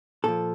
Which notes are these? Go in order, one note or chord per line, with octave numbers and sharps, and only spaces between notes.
A#2 F3 A4